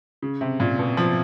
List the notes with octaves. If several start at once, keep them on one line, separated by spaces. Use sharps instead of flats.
C#3
C3
A#2
B2
F3